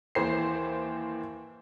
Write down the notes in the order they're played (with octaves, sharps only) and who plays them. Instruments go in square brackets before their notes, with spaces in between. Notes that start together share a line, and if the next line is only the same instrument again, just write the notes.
[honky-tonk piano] D#2 E3 C5 C7